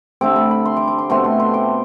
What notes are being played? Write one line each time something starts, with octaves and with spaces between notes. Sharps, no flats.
D3 A3 C4 D6
B5
B5
C6
D6
D6
C6
B2 A3 C4 C6
C6
C6
D6